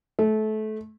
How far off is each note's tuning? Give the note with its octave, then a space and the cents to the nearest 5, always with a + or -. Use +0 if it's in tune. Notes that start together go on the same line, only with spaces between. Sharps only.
A3 -25